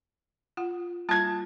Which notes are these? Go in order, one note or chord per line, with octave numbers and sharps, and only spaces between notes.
F4 F#5
G3 A#3 F4 A5 G#6